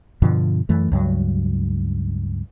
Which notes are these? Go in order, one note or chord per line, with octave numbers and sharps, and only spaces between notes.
G2 B2 D3 F3
F#2 E3 A3
C#2 G2 F#3